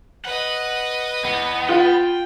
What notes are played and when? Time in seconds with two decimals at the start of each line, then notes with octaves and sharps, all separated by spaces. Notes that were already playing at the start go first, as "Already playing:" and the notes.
0.25 B4 D#5 F#5
1.24 E2 B3
1.69 F4 G5